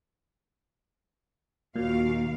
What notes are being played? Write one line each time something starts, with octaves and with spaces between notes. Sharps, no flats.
D#2 A#2 F#4 F5